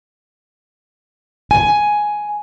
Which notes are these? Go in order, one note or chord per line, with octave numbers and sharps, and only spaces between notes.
G#5